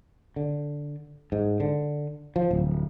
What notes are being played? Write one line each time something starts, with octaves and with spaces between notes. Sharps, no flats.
D3
G#2
D3
F3
D1